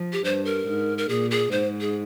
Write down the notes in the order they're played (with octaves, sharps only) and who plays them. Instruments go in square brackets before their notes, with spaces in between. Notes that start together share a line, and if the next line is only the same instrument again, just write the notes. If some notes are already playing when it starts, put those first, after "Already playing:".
Already playing: [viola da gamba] F3
[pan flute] G4
[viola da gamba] G2 [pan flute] C5
[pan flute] A#4
[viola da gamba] G#2
[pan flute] A#4
[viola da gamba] A#2 [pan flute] G#4
[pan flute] G#4
[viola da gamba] G#2 [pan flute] C5
[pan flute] G#4